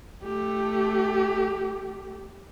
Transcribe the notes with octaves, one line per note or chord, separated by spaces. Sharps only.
A3 G4